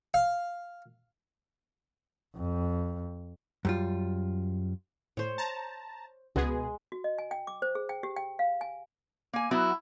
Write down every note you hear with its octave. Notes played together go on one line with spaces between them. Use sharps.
F5
F2
F#2 G3 F4
A2 C5 C#5
A5 A#5
C#2 B2 G#3 B3 G#4
F#4
D#5
G#5
G5
D6
C5
G#4
G5
G4
G5
F5
G#5
A#3 G#5
F#3 B3 E4 F#4